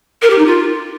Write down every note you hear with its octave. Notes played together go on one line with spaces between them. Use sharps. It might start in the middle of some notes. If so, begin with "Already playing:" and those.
A#4
G4
D#4
F4